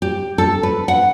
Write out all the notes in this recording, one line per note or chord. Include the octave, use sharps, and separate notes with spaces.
G4
A4
B4
F#5